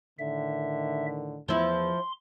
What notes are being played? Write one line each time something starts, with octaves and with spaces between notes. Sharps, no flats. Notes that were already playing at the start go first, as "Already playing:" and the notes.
A2 D3 D#3 E5
E2 F3 E4 C6